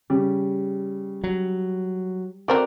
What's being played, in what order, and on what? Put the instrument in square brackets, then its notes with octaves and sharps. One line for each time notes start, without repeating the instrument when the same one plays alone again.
[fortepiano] C#3 [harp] G3
[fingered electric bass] F#3
[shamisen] A3 C4 A#4 [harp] F#4 D5 F6